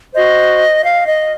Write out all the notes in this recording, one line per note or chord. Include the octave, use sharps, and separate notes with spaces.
F#4 C5 D#5
F5
D#5